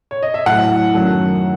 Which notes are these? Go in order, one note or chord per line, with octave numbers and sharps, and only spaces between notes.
C#5
D#5
E5
A2 F#3 A3 F#5
F#2 D#3 F#3 A3